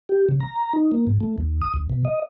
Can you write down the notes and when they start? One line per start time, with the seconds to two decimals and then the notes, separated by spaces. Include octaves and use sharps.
0.09 G4
0.29 C#3
0.40 A#5
0.73 D#4
0.92 A#3
1.07 G#2
1.20 A3
1.38 D#2
1.61 D#6
1.74 D2
1.89 B2
2.05 D#5